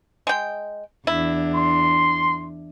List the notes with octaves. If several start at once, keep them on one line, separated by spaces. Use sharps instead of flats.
G#3 G5
E2 D4 E4
C6